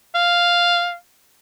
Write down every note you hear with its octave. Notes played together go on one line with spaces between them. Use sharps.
F5